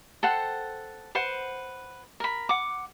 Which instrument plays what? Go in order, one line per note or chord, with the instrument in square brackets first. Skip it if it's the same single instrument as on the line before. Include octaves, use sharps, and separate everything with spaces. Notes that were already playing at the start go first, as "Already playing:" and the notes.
[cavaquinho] A4 C5 F#5 G5
B4 C5 F#5
A#4 B5
F#5 D6